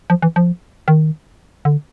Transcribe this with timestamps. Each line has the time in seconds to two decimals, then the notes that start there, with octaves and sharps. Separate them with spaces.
0.10 F3
0.22 E3
0.36 F3
0.88 D#3
1.65 D3